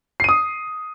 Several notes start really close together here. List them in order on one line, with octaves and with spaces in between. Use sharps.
C7 D#7 D#6